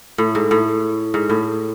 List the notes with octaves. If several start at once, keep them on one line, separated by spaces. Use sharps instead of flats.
A2
G#2
A2
G#2
A2